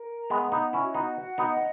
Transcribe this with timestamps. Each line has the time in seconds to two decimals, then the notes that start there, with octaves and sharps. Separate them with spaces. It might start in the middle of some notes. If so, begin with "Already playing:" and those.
Already playing: A#4
0.20 A#5
0.30 G#3 B3
0.52 B3 D#4 D#5
0.73 C#4 E4
0.84 F#4
0.95 B3 D#4
1.16 F#5
1.38 B3 D#4
1.49 D#5